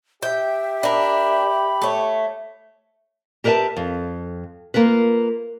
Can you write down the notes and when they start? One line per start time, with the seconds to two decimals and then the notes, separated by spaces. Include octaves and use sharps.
0.23 G4 E5 G5
0.83 D4 A#4 B5
1.82 A3 C#5
3.44 G4 A#4 B4 C#5 E5 A5
3.77 F2
4.74 A#3 F4 A#4 B4